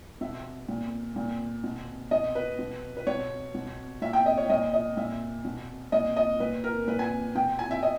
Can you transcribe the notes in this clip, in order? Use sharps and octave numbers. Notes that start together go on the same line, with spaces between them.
B2 E5
A#2
A#2
B2
B2 D#5
B4
B2
B4
B2 C#5
B2
A#2 E5
G5
D#5
C#5
A#2 D#5
D#5
A#2 E5
B2
A#2 D#5
D#5
A#2 B4
A#4
A#2 B4
G#5
B2 G5
G#5
E5
D#5